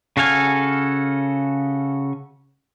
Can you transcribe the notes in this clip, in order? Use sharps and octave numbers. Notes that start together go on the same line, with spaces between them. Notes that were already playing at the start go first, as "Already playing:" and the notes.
C#3 F#4 A4 F5 G#5